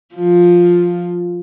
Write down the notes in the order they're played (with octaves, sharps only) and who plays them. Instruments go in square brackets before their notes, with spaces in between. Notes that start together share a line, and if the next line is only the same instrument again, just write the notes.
[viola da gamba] F3 F4